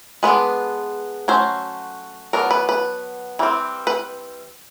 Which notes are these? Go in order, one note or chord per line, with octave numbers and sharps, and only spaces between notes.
G#3 B3 D4 B4
F#3 A3 C#4 C5
F#3 B3 D4 A#4
B4
B4
E3 G3 C4
B4